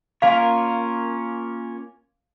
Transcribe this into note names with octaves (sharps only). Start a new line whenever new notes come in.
A#3 C#4 F4 A#4 C#5 F5